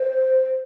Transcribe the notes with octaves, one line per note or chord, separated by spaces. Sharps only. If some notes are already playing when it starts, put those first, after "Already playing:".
Already playing: C5